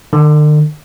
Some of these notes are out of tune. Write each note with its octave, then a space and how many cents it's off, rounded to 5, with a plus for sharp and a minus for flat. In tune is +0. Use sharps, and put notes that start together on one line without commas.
D3 +45